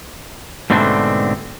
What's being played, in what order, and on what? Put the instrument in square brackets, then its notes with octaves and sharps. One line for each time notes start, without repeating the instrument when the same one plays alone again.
[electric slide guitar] G#2 B2 D3 A3 C4 D4